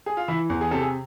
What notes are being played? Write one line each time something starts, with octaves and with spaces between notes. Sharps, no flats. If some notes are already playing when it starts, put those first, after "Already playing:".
G#4
F4
E3 E4
E2
G#4
C3 A4
G#4